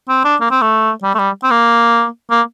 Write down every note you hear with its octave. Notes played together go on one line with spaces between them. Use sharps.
C4
D4
A#3
C4
A3
G3
A3
G3
C4
A#3
A#3